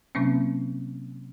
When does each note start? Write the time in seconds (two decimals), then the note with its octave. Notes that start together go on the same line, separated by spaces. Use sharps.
0.15 C3 F#3 A#3 C4 C#4